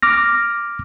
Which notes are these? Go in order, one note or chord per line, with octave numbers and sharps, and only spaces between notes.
D6 F6 A#6